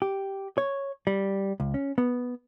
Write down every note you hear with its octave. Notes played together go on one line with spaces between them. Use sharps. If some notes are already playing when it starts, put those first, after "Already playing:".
G4
C#5
G3
C#2
C#4
B3